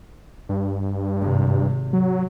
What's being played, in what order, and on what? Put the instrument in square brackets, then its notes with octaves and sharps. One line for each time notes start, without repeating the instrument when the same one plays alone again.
[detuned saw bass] G2
[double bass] G#1 C3
[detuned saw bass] F#3